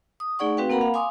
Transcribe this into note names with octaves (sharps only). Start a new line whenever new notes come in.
D#6
A3 D#4 G#4 D5 F#5 C#6
C4 F#4 B4 F5 G5
A#3 A#4 F#5 A#5 B5
F5
F5 G#5 C6 D6 D#6